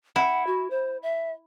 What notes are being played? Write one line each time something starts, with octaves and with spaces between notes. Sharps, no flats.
E4 F#5
F#4
C5
E5